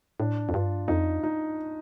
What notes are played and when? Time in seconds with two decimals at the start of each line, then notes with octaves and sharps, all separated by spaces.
0.19 A2 D4
0.49 F2
0.54 G2 F4
0.88 F2 D#4
1.23 D#4